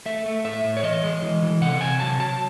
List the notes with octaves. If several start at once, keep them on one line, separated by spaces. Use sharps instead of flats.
A3 E5
A3
A2 E5
A2
C#5
E3 D#5
G#3
E3
E3
C3 F#5
C3 G#5
F#3 A5
F#3 A5